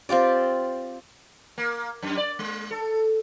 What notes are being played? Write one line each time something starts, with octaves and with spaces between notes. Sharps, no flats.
C4 F4 G4 D5
A#3
F#2
D5
G#3
A4